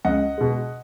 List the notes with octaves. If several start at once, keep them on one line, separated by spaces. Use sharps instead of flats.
C#2 D#5 F#5
B2 G#3